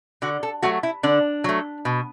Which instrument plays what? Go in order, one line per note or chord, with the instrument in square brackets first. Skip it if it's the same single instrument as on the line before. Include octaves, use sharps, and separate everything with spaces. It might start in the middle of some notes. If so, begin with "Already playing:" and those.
[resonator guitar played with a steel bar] D3 F#4
A4
F#3 A3 F#4
E4
D3 D4
F#3 A3
B2